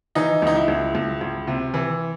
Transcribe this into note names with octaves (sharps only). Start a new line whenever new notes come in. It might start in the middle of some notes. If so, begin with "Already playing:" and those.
E3 D#4
C#2 D#4
E4
C#2
C#2
C#2
C3
E3